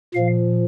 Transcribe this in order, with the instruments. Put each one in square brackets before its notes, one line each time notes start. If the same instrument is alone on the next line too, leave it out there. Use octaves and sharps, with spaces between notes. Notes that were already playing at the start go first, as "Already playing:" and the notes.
[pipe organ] A#2 F3 F5